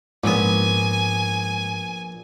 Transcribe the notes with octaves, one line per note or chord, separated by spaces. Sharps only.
A#1 G#2 B3 G#5